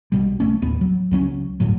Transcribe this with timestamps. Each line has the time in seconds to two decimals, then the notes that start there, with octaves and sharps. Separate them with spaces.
0.12 B1 B2 G3
0.40 B1 F#2 A3 C#4
0.62 A1 D#2 B3
0.81 F#3
1.11 C#2 F#3 C4 C#4
1.60 G1 D2 A2 F#3